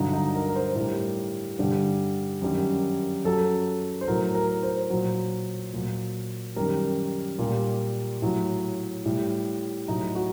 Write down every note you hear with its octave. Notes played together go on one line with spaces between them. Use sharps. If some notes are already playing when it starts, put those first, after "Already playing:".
Already playing: G2 D3 F#3 D#4
D#4
A#4
A#4
C5
A2 G3 A#4
G2 D3 G3
F#2 D#3 G3
F#2 F#3 A4
C5
A2 F#3 A#4
A#4
C5
A#2 F#3
A#2 F#3
F#2 D#3 G3 A#4
A#2 G3 A#4
A2 F#3
A2 G3
A2 F#3 D#4
F#4